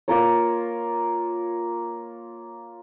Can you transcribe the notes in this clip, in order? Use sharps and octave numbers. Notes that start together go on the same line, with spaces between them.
A#3 F4 A#4 C#5